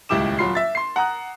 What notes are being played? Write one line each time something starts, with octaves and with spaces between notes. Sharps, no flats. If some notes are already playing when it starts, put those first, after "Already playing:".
D#1 C#2 E4 G4 D6 E7
D#1 F#3 F4 B5 C6 C7
E5 A6
C6 C7
F#5 A#5 D#6 F#6